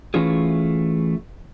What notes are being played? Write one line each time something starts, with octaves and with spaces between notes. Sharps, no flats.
E3 A3 C#4 F4 G#4